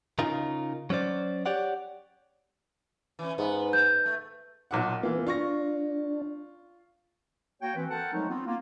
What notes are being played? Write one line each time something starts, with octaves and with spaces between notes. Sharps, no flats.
C#3 D#4 F4 A#4
F#3 C#4 C5 D5
G4 C#5 D5 F#5
E3 C#4
G#2 B3
G6
A3
B1 A#2 F#5
E3 A#3 B3 F4
D4 F4 C#6 A#6
A#3 F#4 C#5 G5
E3 C4 B4
C4 A4 A#4 F#5 G5 A5
F3 F#3 G#3 A3 D#4
B3 C4 F4
A#3 F4